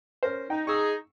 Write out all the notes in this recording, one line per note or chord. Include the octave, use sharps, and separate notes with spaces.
C#4 A#4 C5
D#4 G5
D#4 G#4 C#6 E6